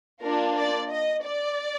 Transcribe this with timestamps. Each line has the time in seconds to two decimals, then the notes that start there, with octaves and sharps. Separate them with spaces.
0.22 A#3 D4 F4 A#4
0.56 D5
0.90 D#5
1.24 D5